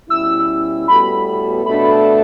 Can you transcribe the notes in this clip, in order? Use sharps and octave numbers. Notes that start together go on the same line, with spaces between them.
B2 G3 C#4 E4 E6
A2 G3 B3 F#4 A4 B5
B2 A3 D4 A4 B5